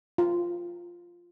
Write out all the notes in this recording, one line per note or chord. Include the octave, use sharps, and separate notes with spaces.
F4